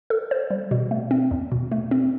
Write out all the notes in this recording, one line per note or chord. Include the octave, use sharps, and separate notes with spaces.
A4
C5
G3
B2
A3
C4
E2
B2
A3
C4